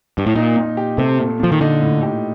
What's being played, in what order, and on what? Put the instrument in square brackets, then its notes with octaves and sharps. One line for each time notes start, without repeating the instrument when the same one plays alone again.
[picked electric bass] G2
A2
[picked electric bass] A#2 [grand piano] D#4
[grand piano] A#2
G4
[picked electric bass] C3 [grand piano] A3
[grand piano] A#2
[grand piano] A#2 [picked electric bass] F3
[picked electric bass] D#3
[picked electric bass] D3 [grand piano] D#4
[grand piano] A2
G4